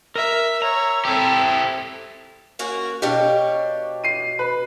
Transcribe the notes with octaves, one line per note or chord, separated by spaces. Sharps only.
A#4 E5 E6
C#5 A#5
C4 E4 G4 A4
A#3 C#4 F#4
B2 D4 G4 C#5 F5
C7 D#7
B4